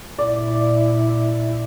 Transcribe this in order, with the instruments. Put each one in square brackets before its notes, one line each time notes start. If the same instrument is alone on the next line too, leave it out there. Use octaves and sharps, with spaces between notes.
[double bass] A#2 E4 [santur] D5